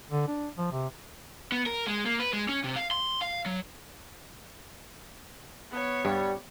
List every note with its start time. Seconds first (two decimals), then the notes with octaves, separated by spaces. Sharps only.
0.10 D3
0.28 D4
0.58 F3
0.72 C3
1.52 B3
1.66 A#4
1.87 G#3
2.06 A#3
2.20 B4
2.33 G#3
2.49 C#4
2.64 C3
2.76 F5
2.91 C6
3.22 F5
3.46 F#3
5.72 B3 C#5
6.05 G2 G3